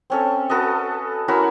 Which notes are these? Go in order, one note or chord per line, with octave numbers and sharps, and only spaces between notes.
C4 C#4 A4
F#4 A4 B4 D#5
C#4 E4 F#4 A#4